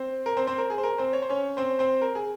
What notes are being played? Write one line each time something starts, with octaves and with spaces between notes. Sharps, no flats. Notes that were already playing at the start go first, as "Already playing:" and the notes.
Already playing: C4 C5
A#4
C4 C5
C4 C5
A#4
G#4
C5
A#4
C4 C5
C#5
C5
C#4 C#5
C4 C5
C4 C5
A#4
G#4